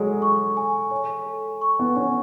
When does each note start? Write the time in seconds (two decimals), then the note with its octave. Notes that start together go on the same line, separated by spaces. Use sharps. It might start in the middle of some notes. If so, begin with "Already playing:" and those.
Already playing: F#3 G#3 A4 C#5
0.22 C#6
0.57 G#5
0.91 C#5
1.27 A4
1.61 C#6
1.79 B3
1.96 C#4 G#5